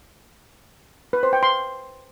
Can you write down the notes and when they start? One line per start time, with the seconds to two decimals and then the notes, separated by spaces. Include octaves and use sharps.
1.13 B4
1.23 C5
1.33 G5
1.43 C6